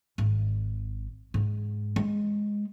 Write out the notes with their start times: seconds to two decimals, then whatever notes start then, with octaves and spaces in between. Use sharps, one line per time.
0.18 G#1
1.34 G#2
1.96 G#3